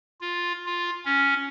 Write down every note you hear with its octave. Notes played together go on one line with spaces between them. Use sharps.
F4
F4
C#4